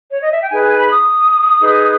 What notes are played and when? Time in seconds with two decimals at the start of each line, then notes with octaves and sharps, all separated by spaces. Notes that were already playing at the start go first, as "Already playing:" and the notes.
0.11 C#5
0.21 D#5
0.31 E5
0.41 G5
0.50 D#4 G#4 B4 G#5
0.64 G#5
0.78 B5
0.92 D#6
1.61 D#4 G#4 B4